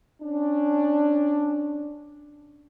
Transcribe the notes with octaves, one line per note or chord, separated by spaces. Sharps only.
C#4 D4